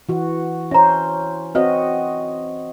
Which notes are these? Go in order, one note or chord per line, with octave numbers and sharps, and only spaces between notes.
E3 F#4
C#4 C5 E5 A#5
C4 F#4 B4 C#5 D#5 F5